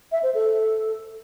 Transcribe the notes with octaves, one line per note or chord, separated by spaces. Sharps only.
E5
C5
A4